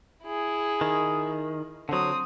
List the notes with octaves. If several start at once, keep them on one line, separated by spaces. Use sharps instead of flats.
E4 G#4
D#3
D3 F#3 C4 D#6